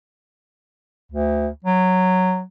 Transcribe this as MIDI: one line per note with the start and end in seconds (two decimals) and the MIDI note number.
1.12 1.47 38
1.64 2.42 54